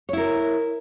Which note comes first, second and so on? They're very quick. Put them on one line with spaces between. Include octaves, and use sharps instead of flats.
C#5 E4 A#4